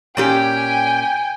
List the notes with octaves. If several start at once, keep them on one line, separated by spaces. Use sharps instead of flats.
A#2 C#4 G4 G5 G#5